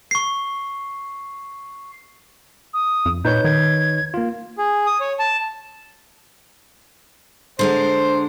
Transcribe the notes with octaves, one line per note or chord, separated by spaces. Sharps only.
C#6 C7
D#6
F2
A#2 D#4 B4 C#5 G6
D#3 G#6
A#3 F4
G#4
D#6
C#5
A5
D3 G#3 A#4 C5